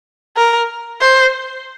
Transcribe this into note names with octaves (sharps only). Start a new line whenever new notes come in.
A#4
C5